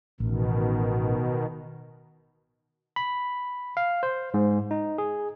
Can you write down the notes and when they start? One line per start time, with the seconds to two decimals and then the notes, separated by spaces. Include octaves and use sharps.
0.20 A1 B2 D#3
2.96 B5
3.77 F5
4.03 C5
4.34 G#2
4.71 D#4
4.98 G#4